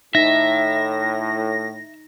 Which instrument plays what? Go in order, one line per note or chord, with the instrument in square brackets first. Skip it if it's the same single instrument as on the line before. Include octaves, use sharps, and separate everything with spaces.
[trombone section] A2 [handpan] D#4 [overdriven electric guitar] E5 [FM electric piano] A#6